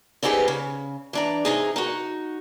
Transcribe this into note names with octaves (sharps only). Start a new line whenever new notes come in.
B3 C4 D#4 G4 G#4 B4
C#3
E3 D4 A#5
C3 D#4 G#4
D#4 F#4